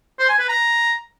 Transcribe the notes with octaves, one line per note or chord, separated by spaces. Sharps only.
C5
G#5
B4
A#5